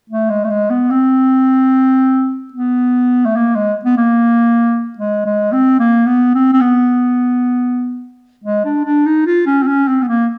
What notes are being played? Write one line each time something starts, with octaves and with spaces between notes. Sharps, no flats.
A3
G#3
A3
G#3
B3
C4
B3
A3
A#3
G#3
B3
A#3
G#3
G#3
C4
A#3
B3
C4
C4
B3
G#3
D4
D4
D#4
F4
C#4
C4
C#4
C4
B3
A#3